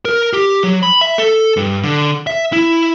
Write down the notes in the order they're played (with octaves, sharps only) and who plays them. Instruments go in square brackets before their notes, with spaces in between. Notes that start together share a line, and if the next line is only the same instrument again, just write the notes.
[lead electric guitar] A#4
G4
F#3
B5
E5
A4
G2
D3
E5
E4